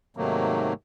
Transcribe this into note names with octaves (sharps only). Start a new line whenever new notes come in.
G#2 C3 D#3 F#3 A3 A#3